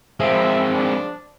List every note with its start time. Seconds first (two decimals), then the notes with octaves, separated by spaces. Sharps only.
0.20 F3 G#3 C4 E5
0.75 D4